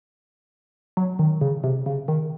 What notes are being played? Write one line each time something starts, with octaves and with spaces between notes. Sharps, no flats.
F#3
D#3
C#3
C3
C#3
D#3